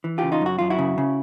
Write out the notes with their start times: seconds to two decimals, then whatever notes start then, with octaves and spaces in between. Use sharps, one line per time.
0.04 E3
0.18 C#3 F4 G4
0.32 D#4 F4
0.41 F#2 F#4
0.59 F#2 F4
0.70 E4 F#4
0.78 C#3
0.98 C#3